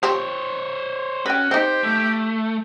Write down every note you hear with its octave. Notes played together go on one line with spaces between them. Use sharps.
F3 C4 G4 C5 C#5
C#4 F#4 B4 G5
C4 D#4 G4 C5
A3